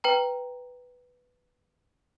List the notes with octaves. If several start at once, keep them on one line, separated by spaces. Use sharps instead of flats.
B4 G5 A#5